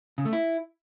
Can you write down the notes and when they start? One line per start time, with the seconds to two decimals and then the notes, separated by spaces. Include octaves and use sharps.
0.18 C#3
0.25 A3
0.33 E4